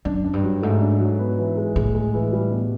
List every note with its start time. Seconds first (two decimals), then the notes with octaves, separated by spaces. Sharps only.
0.05 F#2 D4
0.25 D4
0.33 G2
0.43 F#3
0.62 G#2 A3
0.81 D4
1.00 F#3
1.19 B3
1.38 E3
1.57 G#3
1.76 A2 G#3
1.95 G#3
2.14 E3
2.33 G3
2.51 B2